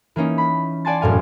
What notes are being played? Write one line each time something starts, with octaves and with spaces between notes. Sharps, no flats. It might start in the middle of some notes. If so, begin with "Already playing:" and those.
E3 A#3 C#4 D#4
B5
D5 F#5 G#5 A5 C6 A6
E1 F#2 A2 F5 G#5